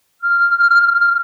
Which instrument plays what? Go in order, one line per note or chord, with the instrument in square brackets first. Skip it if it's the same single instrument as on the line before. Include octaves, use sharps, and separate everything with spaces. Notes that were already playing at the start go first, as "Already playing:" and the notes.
[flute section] F6